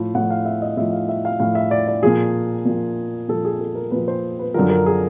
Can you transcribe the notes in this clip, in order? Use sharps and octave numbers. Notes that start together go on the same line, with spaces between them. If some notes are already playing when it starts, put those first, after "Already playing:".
Already playing: A2 F3
A2 F3 F#5
F5
E5
D#5
A2 F3 E5
F5
E5
F5
A2 F3 F5
E5
D5
D5
A#2 F3 G#4
A#2 F3
A#2 F3 A4
G#4
A4
A#4
A#2 F3 B4
C5
B4
F#2 D3 F3 A#4
A#4
G#4